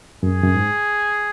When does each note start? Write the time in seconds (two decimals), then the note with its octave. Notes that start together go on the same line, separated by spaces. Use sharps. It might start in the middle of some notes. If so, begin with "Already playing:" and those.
0.23 F#2 G#4
0.44 F#2
0.55 G#2